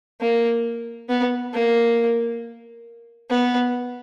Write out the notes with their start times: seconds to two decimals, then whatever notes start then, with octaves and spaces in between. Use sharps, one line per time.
0.21 A#3
1.09 B3
1.53 A#3
3.30 B3